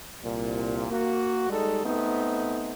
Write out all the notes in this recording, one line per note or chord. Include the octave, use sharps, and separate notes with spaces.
C2 A#2
A#3 F#4
G3 G#3 D#4 A4
A3 B3 C4 D#4